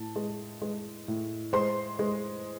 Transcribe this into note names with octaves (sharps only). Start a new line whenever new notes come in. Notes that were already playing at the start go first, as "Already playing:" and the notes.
Already playing: A2 A5
G#3
G#3
A2
G#3 C5 C6
G#3